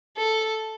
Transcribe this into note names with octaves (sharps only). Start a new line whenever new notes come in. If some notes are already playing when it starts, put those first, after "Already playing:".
A4